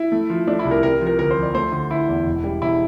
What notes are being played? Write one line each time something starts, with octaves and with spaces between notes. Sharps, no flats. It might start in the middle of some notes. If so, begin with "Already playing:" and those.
Already playing: E4
A3
F3
A3 D4
E4
C2
A#4
C3 A#4
F3
A#4
D2 A#4
C5
F3
D5
A3 C5
D3
D3 E4
E2
E1
G3
E1 E4